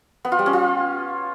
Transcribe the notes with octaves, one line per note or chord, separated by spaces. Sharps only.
B3
F4
G3
C#4
F4